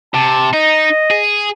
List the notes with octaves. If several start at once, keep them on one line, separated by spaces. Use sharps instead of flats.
C3 A5
D#4 D#5
G#4